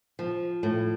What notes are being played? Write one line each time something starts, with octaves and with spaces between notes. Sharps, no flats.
F3
A2